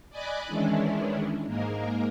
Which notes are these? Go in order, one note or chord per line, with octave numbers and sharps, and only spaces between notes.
D5 D#5 G#5 B5 D6 F#6
D#3 E3 G#3 C#4 D4 E4
G#2 G#3 A#3 A#4